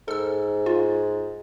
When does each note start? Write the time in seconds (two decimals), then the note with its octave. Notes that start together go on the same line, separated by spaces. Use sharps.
0.08 G#2 A4 E6
0.66 F4